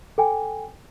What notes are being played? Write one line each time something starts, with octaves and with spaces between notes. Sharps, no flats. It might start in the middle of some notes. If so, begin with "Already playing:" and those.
A4 G5 G#5